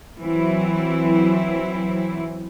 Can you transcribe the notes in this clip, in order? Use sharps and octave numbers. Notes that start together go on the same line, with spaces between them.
E3 F#3 C4 E4